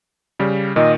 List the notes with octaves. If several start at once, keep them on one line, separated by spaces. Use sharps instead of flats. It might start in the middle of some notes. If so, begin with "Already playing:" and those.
C#3 G3
A#2 D#3 D#5